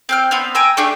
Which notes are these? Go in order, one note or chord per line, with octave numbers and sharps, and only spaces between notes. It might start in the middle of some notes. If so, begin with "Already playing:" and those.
C4 G5 F6
B3 C4 F5
G5 G#5 A#5 E6
A3 D4 G4 G#4